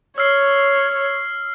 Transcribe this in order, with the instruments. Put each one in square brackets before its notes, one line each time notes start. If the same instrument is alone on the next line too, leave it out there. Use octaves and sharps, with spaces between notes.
[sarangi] C#5 [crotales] E6 F6 C7